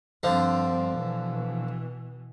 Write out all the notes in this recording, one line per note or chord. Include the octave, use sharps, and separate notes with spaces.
G2 D3 F3 C4
B2 E3